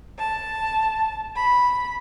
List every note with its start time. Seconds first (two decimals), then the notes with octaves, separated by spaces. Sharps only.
0.19 A5
1.36 B5